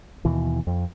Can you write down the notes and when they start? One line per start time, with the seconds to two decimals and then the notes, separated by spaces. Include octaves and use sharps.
0.25 D#2 B2 E3
0.67 F2